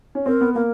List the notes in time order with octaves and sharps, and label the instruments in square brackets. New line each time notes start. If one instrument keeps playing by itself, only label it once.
[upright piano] C#4
[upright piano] C4 [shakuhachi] A#4
[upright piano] B3
[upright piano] A#3 [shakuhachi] A#4